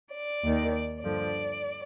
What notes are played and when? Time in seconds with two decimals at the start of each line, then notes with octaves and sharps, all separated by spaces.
0.14 D5
0.44 D#2 D#3
1.02 G2 D3 F3 D5